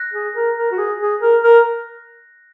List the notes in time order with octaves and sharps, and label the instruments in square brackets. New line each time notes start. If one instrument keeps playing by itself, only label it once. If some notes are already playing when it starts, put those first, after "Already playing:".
Already playing: [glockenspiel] F#6 A#6
[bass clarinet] G#4
A#4
A#4
F#4
G#4
G#4
A#4
A#4